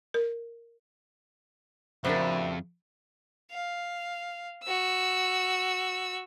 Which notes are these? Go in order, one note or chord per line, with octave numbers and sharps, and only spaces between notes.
A#4
F2 A2 C#3 D4 F#4 A#4 C5 E5
F5
F#4 E6